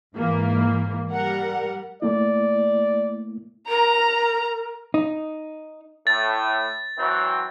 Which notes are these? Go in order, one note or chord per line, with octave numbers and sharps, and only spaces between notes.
G#2 E3 A#3
G3 A#4 F#5
A3 A#3 E4 D5
A#4 A#5
D#4
A2 A6
E3 F#3 C4